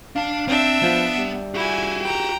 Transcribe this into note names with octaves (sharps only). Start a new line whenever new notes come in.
D4 F5 A5
C4 D4 E5
F3 B3
G3
E4 F#4 G4 G#5
G5 A#5